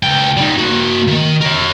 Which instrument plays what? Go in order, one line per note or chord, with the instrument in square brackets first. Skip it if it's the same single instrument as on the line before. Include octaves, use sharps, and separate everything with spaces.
[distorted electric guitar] C#2 G5
G3 D#4
A#3 F#4
D#3
A#4 C#5